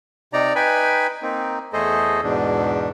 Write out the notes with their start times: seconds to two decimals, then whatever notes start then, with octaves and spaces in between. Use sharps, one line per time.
0.33 C3 D#4 D5 A#5
0.56 D#4 B4 G5 G#5 B5
1.22 A#3 C4 D#4
1.73 E2 A3 G#4 A4 C5 D#5
2.23 E2 G#2 B2 D4